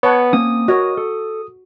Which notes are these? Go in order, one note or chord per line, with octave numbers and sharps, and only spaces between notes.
B3 C#5 F#5 A5
A#3 C4 C#4 D#6
F#4 A#4 C#5 D#5
A4